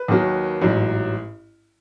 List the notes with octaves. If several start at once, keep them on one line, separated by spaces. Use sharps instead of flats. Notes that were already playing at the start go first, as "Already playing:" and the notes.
Already playing: B4
D#2 D#3 F#3
A1 G#2 F#3